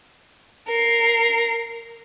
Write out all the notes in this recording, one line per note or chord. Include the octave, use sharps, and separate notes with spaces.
A#4 C7